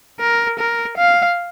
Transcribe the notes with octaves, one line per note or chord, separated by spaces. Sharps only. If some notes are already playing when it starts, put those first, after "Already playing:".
A#4
A#4
F5